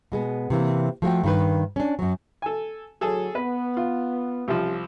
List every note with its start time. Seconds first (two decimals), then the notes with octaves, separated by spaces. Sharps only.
0.12 B2 G#3 B3
0.50 C3 E3 A#3
1.02 F3 A3 F#4 G5
1.24 G2 D#3 B4
1.76 C#4 D4
1.99 F#2 F#3
2.42 A4 G#5
3.01 A2 D3 F#3 G#4 A4
3.35 B3 B4
3.77 F4
4.48 C2 F3 C#4 G4